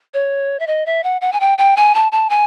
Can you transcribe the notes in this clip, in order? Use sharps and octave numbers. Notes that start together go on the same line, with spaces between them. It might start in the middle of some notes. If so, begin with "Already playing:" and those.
C#5
E5
D#5
E5
F#5
F#5
G#5
G5
G5
G#5
A5
A5
G#5